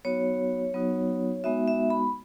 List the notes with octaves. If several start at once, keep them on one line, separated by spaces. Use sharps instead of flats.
F#3 B3 D#4 F#4 C#5
F#3 B3 D#4 F#4
G#3 B3 D#4 F#4 E5
E5
B5